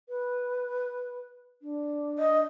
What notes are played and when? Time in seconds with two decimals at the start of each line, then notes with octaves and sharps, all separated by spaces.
0.09 B4
1.62 D4
2.19 D#5